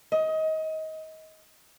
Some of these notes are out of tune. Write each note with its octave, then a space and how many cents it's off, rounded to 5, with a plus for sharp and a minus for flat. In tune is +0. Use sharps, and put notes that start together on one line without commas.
D#5 +25